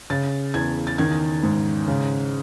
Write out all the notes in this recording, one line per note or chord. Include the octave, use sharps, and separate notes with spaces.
C#3 A6
E2 G#6
A6
D#3 G#6
G#2
C#3